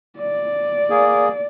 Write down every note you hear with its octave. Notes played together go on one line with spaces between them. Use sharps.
D5
A#3 G#4